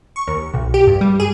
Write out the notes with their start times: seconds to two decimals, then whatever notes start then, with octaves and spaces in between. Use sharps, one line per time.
0.16 C#6
0.28 D#2
0.54 B1
0.74 G4
0.87 G2
1.01 G3
1.20 G#4